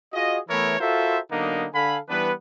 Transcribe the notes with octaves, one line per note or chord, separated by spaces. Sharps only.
F4 F#4 G#4 D#5
E3 A3 B3 E4 A#4 C#5
F4 F#4 A4 A#4 C5 E5
D3 F#3 A#3 B3 D4 D#4
D3 A4 F5 G#5 B5
E3 G3 B3 D4 B4